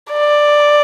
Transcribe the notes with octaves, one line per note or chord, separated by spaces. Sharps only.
D5